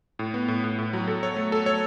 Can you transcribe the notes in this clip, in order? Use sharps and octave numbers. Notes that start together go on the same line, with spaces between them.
A2
B3
A2
A2
A2
F#3
A4
C#5
A3
A4
C#5